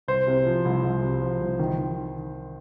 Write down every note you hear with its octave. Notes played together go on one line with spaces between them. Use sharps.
C2 C5
C3
F3
C2
C2
C3
F3
C2
D#3
D#3